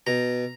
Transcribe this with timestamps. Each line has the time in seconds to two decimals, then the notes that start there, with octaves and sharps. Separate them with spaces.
0.07 B2 A#5